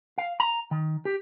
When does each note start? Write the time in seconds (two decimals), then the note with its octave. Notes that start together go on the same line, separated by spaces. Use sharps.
0.18 F5
0.40 A#5
0.71 D#3
1.05 G4